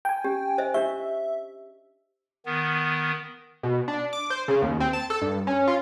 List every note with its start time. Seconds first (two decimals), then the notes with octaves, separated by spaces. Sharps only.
0.05 G5 G#5
0.24 C#4 G4
0.58 C5 D#5 E5
0.74 D4 G4 E5 C#6
2.46 D#3 B3
3.63 B2
3.88 D4
4.13 D6
4.30 C5
4.48 C#3
4.62 D#2
4.80 C4
4.93 A5
5.10 A4
5.22 G2
5.47 C#4
5.67 F4